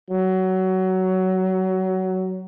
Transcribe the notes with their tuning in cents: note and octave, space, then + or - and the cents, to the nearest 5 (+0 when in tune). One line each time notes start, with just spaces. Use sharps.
F#3 +20